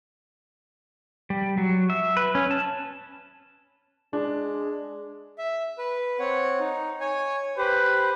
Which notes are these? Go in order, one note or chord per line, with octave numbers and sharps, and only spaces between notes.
G3
F#3
E5
B4
C#4
A5
G#3 D4
E5
B4
C4 C#5 F#5
D#4
C#5 G#5
G4 B4 C5